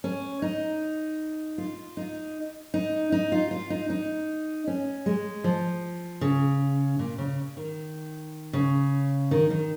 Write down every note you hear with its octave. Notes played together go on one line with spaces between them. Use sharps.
C#4
D#4
F4
D#4
D#4
D#4
F4
F4
D#4
D#4
C#4
G#3
F3
C#3
A#2
C#3
D#3
C#3
D#3
D#3